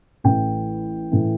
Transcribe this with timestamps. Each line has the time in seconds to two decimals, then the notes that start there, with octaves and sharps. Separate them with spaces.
0.24 A1 A2 E3 G5
1.12 A2 E3